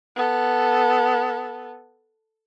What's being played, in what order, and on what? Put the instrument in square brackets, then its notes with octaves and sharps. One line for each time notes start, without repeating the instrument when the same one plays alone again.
[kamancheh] B3 A4